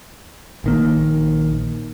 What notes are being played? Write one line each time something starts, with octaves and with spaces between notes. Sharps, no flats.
A#1 D#3 A#3